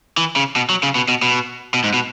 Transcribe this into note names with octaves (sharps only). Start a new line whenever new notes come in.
E3
C#3
B2
F#3
C#3
B2
B2
B2
B2
G#2
B2